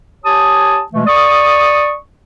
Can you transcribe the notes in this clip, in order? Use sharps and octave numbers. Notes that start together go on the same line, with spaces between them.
G4 C#5 G#5 A5 D#6
B2 E3 G#3 A3
D5 C#6 D#6